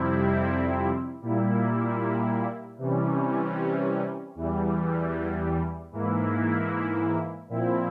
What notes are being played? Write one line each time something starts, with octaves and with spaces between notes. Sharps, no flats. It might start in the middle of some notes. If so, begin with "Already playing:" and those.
Already playing: F2 C3 G3 C4 E4
A#2 G3 A#3 E4
C3 E3 G3 C#4
E2 E3 G3
G#2 E3 A#3 E4
A#2 F3 C4 E4